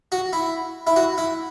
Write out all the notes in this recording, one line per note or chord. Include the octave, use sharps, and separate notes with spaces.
F#4
E4
E4
F#4
E4